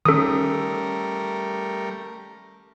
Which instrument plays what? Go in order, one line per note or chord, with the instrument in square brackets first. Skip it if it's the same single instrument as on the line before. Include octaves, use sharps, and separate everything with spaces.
[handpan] D#3 C#4 [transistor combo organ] G3 A3 A#4 [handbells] A4 D#6